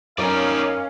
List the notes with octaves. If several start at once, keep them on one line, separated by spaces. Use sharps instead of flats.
F#2 C#4 D#4 A#4 C#5 D5 F5